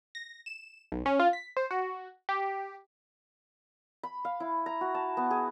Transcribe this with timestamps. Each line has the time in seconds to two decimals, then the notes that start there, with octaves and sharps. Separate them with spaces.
0.15 A#6
0.46 E7
0.92 B1
1.06 C#4
1.20 F4
1.33 B6
1.57 C5
1.71 F#4
2.29 G4
4.03 B5
4.25 F5
4.40 E4
4.66 A#5
4.81 F#4
4.95 A5
5.17 B3
5.31 G#4